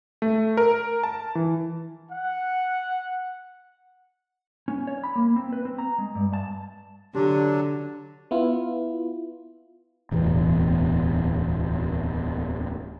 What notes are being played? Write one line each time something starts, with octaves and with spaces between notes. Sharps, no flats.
A3
A#4
A5
E3
F#5
C#4
C#5
B5
A#3
C4
B4
C4
A#5
G#3
G2
A5
D3 F#3 D4 G4
B3 E4 F4
D1 E2 B2